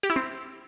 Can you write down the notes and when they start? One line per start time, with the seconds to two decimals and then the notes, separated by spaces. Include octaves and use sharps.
0.03 G4
0.10 E4
0.16 C4